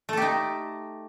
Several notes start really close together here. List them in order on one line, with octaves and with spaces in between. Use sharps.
A3 A4 G4 D#4